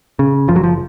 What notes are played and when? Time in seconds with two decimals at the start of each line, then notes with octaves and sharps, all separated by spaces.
0.19 C#3
0.48 F#1 F3
0.56 F#3
0.63 F3